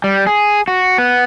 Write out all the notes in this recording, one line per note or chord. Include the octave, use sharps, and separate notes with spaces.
G3
G#4
F#4
B3